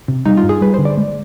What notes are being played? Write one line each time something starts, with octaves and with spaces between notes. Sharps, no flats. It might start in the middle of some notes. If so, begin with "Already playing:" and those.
C3
G3 D#4
F4
G2
G#4
G3 B4
D3 C5
D5
G#3